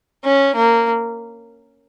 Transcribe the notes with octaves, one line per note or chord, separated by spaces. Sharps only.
C#4
A#3